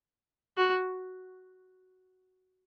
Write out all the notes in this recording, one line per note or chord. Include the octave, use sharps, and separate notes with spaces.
F#4